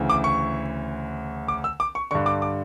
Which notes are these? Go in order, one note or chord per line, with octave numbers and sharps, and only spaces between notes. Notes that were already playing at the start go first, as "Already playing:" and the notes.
Already playing: D2 C#3 E3
D6
C#6
D6
E6
D6
C#6
G2 D3 C#6
D6
D6